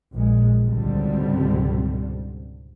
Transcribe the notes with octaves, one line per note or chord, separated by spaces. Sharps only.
A#1 A#2 G#3
C#2 G#2 B2 D3 G3 C4